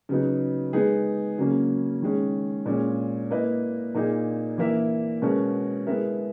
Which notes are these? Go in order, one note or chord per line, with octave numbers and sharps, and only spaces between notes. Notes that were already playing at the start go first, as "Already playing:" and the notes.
C#3 F#3 B3 D#4
G#3 B3 D#4 G#4
C#3 F#3 A#3 C#4
D#3 G#3 C#4
A#2 G#3 C#4
A#3 E4 B4 D#5
A#2 A#3 D#4 G#4
E3 A#3 E4 A#4 E5
B2 G#3 C#4 F#4 A#4
G#3 B3 E4 A#4 E5